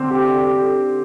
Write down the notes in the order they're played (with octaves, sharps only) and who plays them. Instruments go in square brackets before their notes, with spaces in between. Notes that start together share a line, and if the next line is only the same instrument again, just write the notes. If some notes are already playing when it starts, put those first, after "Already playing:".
Already playing: [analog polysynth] D3 [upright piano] C4
[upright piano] G4
G4